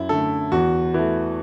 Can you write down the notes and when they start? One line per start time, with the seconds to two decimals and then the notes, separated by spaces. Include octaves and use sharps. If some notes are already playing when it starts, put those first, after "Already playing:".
Already playing: F#2 E4
0.09 D3 A3 A4
0.52 E2 F#4
0.94 E3 A3